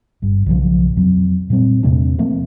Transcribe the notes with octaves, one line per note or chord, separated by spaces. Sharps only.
G1 G2
B1 C#3 E3 F3
F2 F#3
A#2 G3 C4
E2 C3 A3 D4
F3 A3 A#3 C4